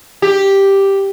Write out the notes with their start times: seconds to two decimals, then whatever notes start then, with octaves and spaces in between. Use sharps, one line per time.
0.22 G4